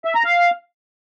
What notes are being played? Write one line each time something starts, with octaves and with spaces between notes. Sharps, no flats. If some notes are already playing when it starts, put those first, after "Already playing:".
E5
A#5
F5